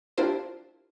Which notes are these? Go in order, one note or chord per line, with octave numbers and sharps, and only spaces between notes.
D4 E4 F4 G4 A#4 C5